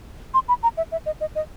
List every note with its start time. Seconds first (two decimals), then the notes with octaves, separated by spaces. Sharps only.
0.34 C6
0.48 B5
0.63 A#5
0.77 E5
0.92 E5
1.06 D#5
1.21 D#5
1.35 D#5